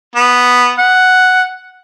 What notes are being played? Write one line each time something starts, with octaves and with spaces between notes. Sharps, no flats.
B3
F#5